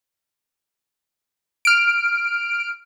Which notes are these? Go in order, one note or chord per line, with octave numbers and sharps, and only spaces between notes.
F6 D7